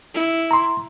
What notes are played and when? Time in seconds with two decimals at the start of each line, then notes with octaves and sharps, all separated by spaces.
0.14 E4
0.51 A#5 C6